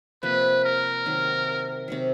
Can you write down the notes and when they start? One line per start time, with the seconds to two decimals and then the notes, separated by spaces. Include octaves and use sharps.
0.23 C3 F3 A#3 B4
0.64 A#4
1.05 C3 D#3 F#3
1.88 C3 D#3 F#3